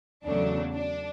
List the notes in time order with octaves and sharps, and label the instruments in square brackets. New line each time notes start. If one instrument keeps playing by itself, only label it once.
[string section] E2 C#3 F#3 A3 D4
D4